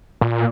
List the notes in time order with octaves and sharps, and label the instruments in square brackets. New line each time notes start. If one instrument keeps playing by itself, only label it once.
[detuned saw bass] A#2